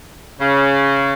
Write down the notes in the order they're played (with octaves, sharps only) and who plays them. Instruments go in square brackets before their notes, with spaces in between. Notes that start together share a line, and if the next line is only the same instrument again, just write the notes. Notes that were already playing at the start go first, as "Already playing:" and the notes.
[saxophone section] C#3